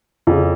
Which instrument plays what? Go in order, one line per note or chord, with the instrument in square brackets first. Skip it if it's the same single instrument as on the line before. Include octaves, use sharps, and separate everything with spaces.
[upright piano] F2 C#3